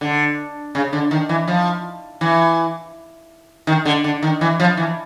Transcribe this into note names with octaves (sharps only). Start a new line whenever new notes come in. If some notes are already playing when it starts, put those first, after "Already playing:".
D3
C#3
D3
D#3
E3
F3
E3
D#3
D3
D3
D#3
E3
F3
E3